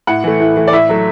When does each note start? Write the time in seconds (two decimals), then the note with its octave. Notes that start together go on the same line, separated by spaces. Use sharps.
0.07 A2 F#5
0.24 E3 A3
0.40 A2
0.56 E3 A3
0.67 D5
0.72 A2 E5
0.89 F#3 A3